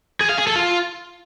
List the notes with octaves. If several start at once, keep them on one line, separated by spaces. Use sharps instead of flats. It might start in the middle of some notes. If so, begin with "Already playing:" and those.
G#4
F5
G#4
A4
F4